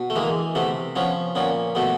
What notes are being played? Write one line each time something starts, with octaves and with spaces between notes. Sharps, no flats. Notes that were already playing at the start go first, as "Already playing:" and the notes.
Already playing: B2
A3
E3 G#3 A#3
C3 A3 B3
F3 B3 C#4
A#2 B3 C#4
B2 A3 B3